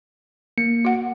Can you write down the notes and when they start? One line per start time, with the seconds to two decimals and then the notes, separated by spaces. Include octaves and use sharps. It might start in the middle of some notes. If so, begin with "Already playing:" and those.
0.58 A#3 C#7
0.85 F#4 F#5